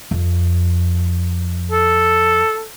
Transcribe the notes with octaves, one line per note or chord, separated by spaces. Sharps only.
F2
A4